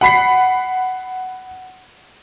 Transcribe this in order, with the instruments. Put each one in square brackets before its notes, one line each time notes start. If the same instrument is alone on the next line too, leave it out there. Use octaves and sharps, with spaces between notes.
[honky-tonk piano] F#5 B5 B6 C7